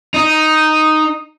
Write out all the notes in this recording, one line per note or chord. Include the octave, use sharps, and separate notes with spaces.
D#4